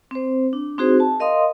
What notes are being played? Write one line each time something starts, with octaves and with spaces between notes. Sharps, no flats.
C4 C5
D4
C4 D#4 F#4 G#4 C5
A5
A#4 D#5 F5 C6 D#6